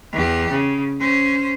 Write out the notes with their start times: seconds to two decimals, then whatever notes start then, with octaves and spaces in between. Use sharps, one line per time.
0.13 E2 G4
0.50 C#3
1.00 C#4 C5